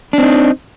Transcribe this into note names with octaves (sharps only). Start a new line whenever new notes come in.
C4 D4 D#4